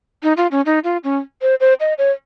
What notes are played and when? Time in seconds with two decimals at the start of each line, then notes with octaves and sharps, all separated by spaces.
0.23 D#4
0.37 F4
0.51 C#4
0.66 D#4
0.84 F4
1.04 C#4
1.42 C5
1.60 C5
1.80 D#5
1.98 C#5